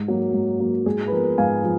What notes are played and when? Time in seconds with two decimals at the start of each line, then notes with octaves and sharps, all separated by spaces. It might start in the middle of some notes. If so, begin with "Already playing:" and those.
Already playing: G#2
0.08 F#3 A#3
0.33 G#2
0.60 F#3 A#3
0.86 G#2 G#4
1.07 B4
1.12 F3 B3 A#4
1.38 G#2 F5 G#5
1.64 F3